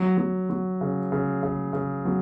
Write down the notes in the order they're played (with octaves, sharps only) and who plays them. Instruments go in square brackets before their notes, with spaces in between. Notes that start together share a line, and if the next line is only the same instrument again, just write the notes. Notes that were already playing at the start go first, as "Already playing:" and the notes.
Already playing: [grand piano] F#3
F#3
F#3
C#3
C#3
C#3
C#3
F#3